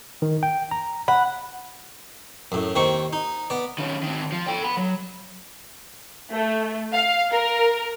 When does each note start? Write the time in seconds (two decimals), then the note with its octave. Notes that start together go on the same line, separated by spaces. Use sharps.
0.22 D#3
0.43 G5
0.71 A#5
1.08 F#5 B5
2.52 F#2 A2
2.75 D#2 D#3 C4 C#6
3.13 D#4
3.50 B3 D5
3.78 D#3 C#4
4.03 D#3 C4
4.32 F3
4.47 A4 G5
4.64 F#5 B5
4.77 F#3
6.31 A3
6.92 F5
7.31 A#4